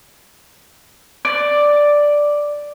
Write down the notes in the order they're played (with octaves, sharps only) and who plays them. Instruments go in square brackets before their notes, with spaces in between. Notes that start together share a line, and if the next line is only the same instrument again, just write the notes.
[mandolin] D5